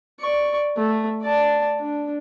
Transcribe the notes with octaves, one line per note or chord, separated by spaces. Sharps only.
D5 C#6
A3
D5 A5
D4